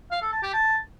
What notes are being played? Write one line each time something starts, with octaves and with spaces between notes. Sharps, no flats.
F5
A4
A5
G4
A5